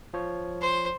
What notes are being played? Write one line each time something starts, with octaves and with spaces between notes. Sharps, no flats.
F3 C#5
C5